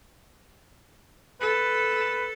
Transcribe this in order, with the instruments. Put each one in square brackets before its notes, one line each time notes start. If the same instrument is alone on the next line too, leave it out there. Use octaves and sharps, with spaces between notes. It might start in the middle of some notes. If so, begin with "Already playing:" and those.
[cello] A4 [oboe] B4